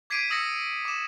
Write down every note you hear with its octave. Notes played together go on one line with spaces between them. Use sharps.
D6 G#6 B6 C7 D7 D#7
D#6 E6 A#6 C#7
D6 E7